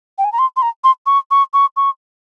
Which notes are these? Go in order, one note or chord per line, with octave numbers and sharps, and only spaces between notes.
G5
G#5
A#5
C6
C6
A#5
C6
C#6
C#6
C#6
C#6